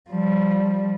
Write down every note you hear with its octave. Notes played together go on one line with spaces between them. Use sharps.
F3 G3